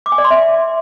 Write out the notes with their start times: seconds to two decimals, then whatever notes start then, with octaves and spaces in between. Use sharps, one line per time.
0.06 D6
0.12 G#5
0.18 D5
0.24 C6
0.31 E5